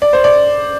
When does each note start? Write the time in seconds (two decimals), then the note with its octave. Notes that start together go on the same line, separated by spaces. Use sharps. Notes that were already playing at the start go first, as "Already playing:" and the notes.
0.02 D5
0.13 C5
0.24 D5